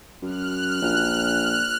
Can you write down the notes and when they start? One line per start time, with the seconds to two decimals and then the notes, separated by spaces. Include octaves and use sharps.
0.22 F#2 F6 F#6
0.82 A#1